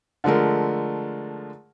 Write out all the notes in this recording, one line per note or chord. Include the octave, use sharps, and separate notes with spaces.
D3 F3 G#3 A3 A#4